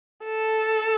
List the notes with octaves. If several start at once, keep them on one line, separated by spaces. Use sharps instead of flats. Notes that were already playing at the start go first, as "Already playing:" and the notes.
A4